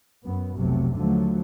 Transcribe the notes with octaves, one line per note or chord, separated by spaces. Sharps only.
F#2 B3
F1 B1 C3 F#3 A3
D#2 D3 F3 F#3 A3